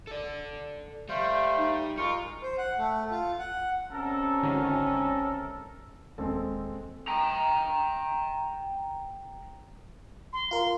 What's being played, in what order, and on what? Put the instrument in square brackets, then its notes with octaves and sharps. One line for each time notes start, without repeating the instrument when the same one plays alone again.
[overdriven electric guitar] A4 D5
[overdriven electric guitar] G3 [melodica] A3 C5 F5
[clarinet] D#4
[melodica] G#3 A#4 [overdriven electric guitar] F4 [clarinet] C#6
[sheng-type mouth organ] C5
F#5
A3
F4
F#5
[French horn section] C3 G3 C#4 [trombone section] A4 A#4
[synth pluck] G#1 D3
[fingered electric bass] D#1 [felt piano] G#3 C4 A4
[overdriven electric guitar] G5 A#5
[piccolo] C6
[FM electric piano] F4 A#4